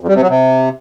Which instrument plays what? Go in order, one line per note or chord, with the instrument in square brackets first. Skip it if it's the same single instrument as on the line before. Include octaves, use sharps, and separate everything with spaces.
[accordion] F2
G3
C3
F#3
C3